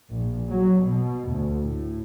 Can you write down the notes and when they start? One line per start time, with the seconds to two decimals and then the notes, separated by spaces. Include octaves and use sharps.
0.13 A#1
0.50 F#3
0.81 B2
1.29 D2
1.62 A2